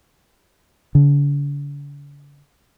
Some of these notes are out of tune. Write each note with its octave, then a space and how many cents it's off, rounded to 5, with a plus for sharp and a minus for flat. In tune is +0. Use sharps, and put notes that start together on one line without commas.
D3 -45